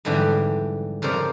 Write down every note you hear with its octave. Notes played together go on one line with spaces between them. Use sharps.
F2 G#2 D3 E3 G3 D4
F2 C#3 A#4 C5 D5 A#5